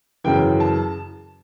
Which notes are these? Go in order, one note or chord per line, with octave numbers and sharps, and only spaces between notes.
F#2 C#3 E3 G5
A5